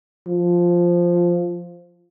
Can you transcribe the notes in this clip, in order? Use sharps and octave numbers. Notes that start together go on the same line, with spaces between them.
F3